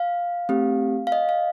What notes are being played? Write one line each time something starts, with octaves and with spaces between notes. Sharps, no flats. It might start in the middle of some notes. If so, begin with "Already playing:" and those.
Already playing: F5
A3 C4 G4
F5
D#5
F5